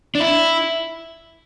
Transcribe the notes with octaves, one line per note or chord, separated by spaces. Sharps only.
D4
E4